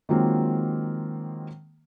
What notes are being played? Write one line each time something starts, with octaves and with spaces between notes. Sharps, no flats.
D#3 F3 F#3 G#3 A#3 C4